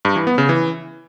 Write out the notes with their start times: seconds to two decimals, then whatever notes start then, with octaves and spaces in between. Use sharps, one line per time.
0.05 G2
0.16 E3
0.27 B3
0.38 C#3
0.49 E3